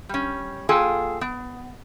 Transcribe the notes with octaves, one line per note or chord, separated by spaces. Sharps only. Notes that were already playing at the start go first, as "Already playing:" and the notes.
G3 C#4
A#3 F4 G#4 A4 G5
B3